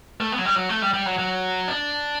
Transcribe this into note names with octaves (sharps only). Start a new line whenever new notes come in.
A3
B3
F#3
G3
F#3
A3
G3
G3
F#3
F#3
D4